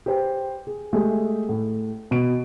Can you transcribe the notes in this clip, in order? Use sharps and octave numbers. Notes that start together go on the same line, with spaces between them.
G4 B4 C5 G5
G#4
G#3 A3 G4 G#4
A2
B2 D7